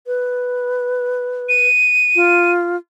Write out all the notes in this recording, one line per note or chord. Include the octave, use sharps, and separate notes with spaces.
B4
D#7
F4